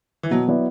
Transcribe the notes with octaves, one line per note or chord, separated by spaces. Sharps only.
E3
B2 F#3
F#3 B3 E4 D5